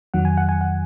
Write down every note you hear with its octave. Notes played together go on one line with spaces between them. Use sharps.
F2 D#3 F#3 F#5
G#5
F#5
G#5
F#5